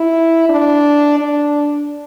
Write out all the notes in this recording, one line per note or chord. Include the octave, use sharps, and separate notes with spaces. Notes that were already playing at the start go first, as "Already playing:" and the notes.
Already playing: E4
D4
D4